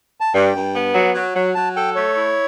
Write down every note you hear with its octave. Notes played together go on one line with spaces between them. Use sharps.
A5
G2 G5
G2
B3
F#3
F#3
F#3
F#3 A5
A4 G5
A3 C#5
E4